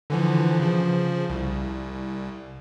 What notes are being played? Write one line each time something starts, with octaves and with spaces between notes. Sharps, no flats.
D3 E3 F3
C#3 F3
C2